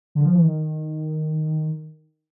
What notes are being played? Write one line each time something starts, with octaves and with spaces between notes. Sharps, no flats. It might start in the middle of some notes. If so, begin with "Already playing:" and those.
D3
F3
E3
D#3